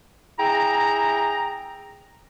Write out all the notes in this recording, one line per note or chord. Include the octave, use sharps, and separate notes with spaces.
E4 G#4 G5 A#5